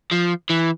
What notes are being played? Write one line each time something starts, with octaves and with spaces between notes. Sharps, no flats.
F3
E3